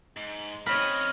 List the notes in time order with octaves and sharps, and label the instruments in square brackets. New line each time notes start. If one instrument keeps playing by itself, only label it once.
[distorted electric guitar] G#2
[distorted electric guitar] C#3 C4 [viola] C#5 D#5 [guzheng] B5 [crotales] F6